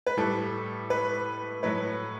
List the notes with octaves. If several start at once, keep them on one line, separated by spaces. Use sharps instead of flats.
B4
A2 G3 A4
B4
A2 F#3 A3 B4